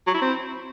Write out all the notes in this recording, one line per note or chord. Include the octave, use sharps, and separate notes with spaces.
F#3
E4
C4